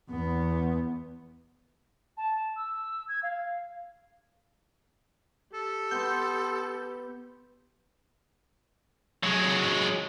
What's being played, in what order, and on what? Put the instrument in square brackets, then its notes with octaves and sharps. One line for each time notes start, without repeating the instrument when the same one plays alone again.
[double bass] E2 B3
[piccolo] A5
E6
G#6
F5
[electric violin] G4 [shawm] A4
[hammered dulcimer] B3 C6 [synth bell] G6
[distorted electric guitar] F#3 G#3